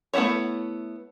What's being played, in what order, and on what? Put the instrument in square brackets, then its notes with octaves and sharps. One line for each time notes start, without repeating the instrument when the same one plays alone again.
[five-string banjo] A3 B3 E4 F#4 C#5